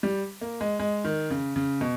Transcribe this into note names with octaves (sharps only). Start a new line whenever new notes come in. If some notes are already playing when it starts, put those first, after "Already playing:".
G3
A#3
G#3
G#3
D#3
C#3
C#3
B2